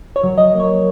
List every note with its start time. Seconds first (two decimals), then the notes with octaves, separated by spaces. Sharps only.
0.16 C#5
0.23 F#3
0.38 D#5
0.53 A#3
0.60 C#5